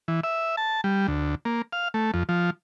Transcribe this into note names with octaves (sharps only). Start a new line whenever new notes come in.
E3
E5
A5
G3
D2
A#3
F5
A3
F2
F3